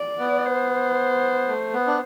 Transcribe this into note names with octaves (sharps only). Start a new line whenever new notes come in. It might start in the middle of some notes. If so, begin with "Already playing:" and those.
Already playing: D5
B3
C5
A3
B3
D4